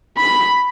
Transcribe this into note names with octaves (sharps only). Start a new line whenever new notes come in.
B5